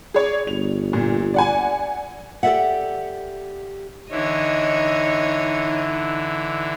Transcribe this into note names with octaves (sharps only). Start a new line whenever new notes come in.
G#4 C#5 D5
G1 F7
A#2
D5 F#5 G#5
G4 A4 C5 D5 E5 F#5
D3 E3 D#4 E4 C#5 D#5